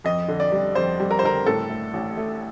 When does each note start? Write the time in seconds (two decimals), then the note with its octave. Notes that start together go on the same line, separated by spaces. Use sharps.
0.04 F2 D#5
0.28 D3
0.40 D5
0.52 G3
0.75 F2 C5
1.00 G3
1.11 A#4
1.19 C5
1.23 D3 A#4
1.46 A2 A4
1.70 A3
1.93 A1
2.17 A3